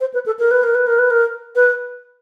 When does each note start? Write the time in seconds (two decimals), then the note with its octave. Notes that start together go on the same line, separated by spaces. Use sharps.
0.01 C5
0.14 B4
0.26 A4
0.39 A#4
0.51 B4
0.63 A#4
0.75 B4
0.87 A#4
0.99 B4
1.10 A#4
1.55 B4